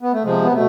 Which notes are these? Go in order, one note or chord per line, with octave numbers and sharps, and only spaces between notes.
B3
A3
C3 F3 G#3
B3
B2 A3